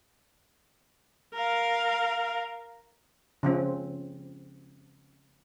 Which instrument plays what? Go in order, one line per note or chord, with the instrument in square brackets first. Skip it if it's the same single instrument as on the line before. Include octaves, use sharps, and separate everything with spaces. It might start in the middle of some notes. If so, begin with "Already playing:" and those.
[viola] A#4 F5
[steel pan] C#3 F3 C4